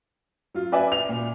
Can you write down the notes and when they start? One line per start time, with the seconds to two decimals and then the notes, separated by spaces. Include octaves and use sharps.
0.54 F#3 F4
0.72 B4 D5 E5 G#5
0.92 F7
1.09 A#2